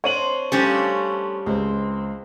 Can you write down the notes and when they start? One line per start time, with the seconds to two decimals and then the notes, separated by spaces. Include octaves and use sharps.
0.04 C4 D4 C#5 D#7 F#7
0.52 F3 G3 A3 C#4 D4
1.46 C#2 C4